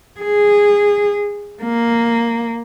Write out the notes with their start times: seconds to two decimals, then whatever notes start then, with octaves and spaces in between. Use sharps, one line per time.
0.21 G#4
1.62 A#3